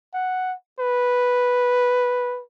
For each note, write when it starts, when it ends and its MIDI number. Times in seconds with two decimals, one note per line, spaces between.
0.14 0.55 78
0.79 2.42 71